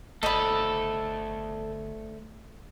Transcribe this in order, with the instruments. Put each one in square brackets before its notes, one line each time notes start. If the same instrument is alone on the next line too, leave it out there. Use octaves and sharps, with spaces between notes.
[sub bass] G1 [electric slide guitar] A3 C5 D5 [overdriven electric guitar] A4 [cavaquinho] D#5 B5